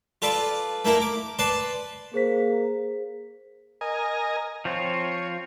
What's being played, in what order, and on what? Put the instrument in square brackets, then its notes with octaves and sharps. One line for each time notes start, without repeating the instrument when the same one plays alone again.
[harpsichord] F4 A4 B4 D5
A3 A#3 E4 A#4
D6
B4 D5 A5 C6
[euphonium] A#3 [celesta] G#4 C5 B6
[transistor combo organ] A#4 D#5 G#5
[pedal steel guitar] F3 C4 F4 [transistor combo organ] C#5